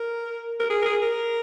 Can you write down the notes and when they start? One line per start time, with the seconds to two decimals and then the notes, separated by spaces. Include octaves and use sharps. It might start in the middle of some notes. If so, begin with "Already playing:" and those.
Already playing: A#4
0.59 A#4
0.70 G#4
0.82 A#4
0.85 G#4
1.02 A#4